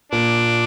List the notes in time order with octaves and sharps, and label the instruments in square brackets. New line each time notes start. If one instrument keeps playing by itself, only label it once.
[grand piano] A#2 [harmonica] D4